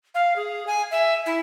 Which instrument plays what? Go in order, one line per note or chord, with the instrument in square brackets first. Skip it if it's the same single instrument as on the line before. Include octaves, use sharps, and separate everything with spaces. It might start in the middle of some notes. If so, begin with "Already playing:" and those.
[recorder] F5
G#4
G#5
E5
E4